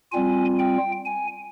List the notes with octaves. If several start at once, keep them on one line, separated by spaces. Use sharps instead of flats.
G3 C4 F4 G#5
G5
G#5